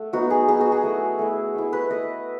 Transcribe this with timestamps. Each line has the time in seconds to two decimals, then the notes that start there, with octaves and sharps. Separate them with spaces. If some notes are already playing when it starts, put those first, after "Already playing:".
Already playing: A3 F#5
0.13 F#3 B3 D#4 F#4
0.30 G#4
0.48 F#3 B3 D#4 G#4
0.61 F#4
0.72 G#4
0.83 A3 E4
1.19 A3 E4
1.55 A3 E4
1.73 B4
1.90 A3 E4 D#5